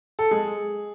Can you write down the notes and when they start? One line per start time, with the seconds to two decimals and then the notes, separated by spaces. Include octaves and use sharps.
0.19 A4
0.31 G#3 G#4